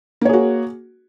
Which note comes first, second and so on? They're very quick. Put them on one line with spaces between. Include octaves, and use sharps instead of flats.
A#3 C#5 G#4 F#4